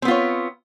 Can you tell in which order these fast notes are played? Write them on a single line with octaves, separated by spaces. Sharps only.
C4 B3 F4 C#5